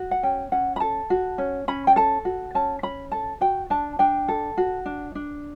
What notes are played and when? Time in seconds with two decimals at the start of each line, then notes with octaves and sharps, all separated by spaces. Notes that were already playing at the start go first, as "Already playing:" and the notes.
Already playing: F#4
0.11 F#5
0.23 C#4 G5
0.52 C#4 F#5
0.76 B5
0.80 A4 A5
1.10 F#4
1.38 C#4
1.68 C#4 B5
1.87 G5
1.96 A4 A5
2.25 F#4
2.55 C#4 A5
2.83 C#4 B5
3.11 A4 A5
3.41 F#4 G5
3.70 D4 A5
3.99 D4 G5
4.28 A4
4.57 F#4
4.86 D4
5.15 D4